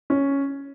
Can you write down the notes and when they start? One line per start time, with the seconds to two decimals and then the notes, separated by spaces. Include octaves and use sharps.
0.10 C#4